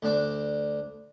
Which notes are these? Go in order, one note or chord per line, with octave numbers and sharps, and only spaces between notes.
D2 D4 D6